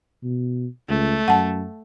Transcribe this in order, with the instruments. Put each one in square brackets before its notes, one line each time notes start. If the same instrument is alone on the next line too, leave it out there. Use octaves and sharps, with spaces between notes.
[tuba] B2
[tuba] C#2 [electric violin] A3
[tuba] F#2 [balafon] F#5 A5